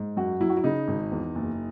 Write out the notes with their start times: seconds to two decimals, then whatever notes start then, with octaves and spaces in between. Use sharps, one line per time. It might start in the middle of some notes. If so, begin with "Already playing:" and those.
Already playing: G#2
0.17 F#2 F#4
0.41 F#3 E4
0.49 F#4
0.57 E4
0.64 C#3 D#4
0.88 G#1
1.11 E2
1.35 F#1